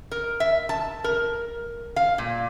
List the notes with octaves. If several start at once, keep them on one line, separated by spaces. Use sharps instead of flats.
A#4
E5
A5
A#4
F5
A#2